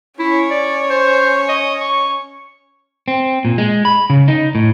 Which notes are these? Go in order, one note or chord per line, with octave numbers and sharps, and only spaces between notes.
C#4 E4 C#5
D5
C5
D#5
C#6
C4
A#2
G#3
B5
C#3
D#4
A2